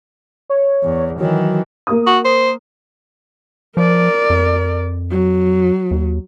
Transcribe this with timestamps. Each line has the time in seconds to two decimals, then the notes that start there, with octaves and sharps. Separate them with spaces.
0.50 C#5
0.83 E2
1.20 D#3 E3 F#3
1.87 A#3 D#6
2.06 F#4
2.25 C5
3.77 F3 A#4 D5
4.30 F2
5.11 F#3
5.91 D#2